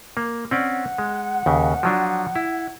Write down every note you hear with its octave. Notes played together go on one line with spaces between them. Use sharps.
A#3
C4 C#4 D5 F#5
G#3
D#2 C#3
F3 F#3 D4
E4